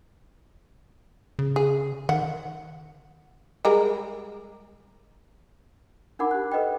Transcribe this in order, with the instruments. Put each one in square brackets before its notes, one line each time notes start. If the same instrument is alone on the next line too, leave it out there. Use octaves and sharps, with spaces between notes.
[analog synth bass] C#3
[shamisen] G#4
[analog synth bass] D#3 [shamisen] F#5
[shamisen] G3 G#3 A#4
[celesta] D4 D#4 A#4 F#5 B5 D6
G4 F#6
A4 B4 D#5 F#5 G5